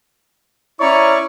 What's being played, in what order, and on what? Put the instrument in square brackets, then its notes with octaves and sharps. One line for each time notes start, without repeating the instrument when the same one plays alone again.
[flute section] C#4 A#5 [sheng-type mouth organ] E4 C#5 D5 [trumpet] C#6